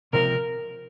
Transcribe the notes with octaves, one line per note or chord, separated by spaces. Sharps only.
C#2 C3 F3 C4 A#4